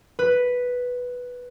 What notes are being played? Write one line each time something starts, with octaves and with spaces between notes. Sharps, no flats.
B4